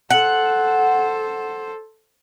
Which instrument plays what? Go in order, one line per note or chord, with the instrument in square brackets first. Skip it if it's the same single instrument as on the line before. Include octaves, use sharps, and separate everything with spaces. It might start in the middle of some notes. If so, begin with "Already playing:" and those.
[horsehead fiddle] A4 C5 [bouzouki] F#5